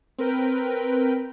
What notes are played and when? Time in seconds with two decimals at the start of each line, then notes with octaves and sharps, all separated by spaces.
0.18 C4 A#4 B4 G5